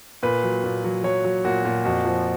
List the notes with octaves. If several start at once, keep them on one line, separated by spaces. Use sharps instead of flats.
A#2 B4
F#3
A#2
F#3
F#3 C#5
F#3
A#2 F#4
A#2
F2 F#4
F3